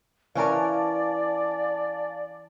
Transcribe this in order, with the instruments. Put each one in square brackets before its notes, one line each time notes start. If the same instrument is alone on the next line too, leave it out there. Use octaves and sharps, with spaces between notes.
[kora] E3 C#4 A#4 [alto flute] D5 [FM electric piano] F5 G#5 A5